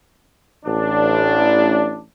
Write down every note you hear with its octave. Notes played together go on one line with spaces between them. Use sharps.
A1 D4